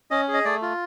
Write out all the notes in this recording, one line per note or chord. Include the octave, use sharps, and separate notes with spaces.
C#4 D#5
G#4
D#5
A3 D5
F4